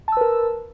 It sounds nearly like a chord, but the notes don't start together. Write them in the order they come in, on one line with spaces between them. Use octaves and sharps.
A5 E6 B4 A#4